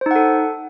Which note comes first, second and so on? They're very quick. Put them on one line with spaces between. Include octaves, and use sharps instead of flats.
C5 D#4 F#5 A4